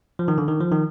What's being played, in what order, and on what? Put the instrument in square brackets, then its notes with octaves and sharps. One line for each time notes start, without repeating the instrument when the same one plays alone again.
[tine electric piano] F3
D#3
D3
D#3
F3
D#3